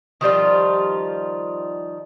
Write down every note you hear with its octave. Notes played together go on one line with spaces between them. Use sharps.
D#3 F3 G3 F4